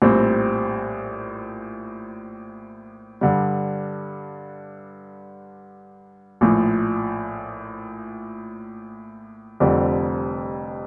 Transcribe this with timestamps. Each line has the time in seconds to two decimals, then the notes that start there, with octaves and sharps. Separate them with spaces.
0.02 A#1 A2 G3 C4
3.21 G2 D3 G3
6.41 A#1 A2 F3
9.60 F1 F2 D3 G3 C4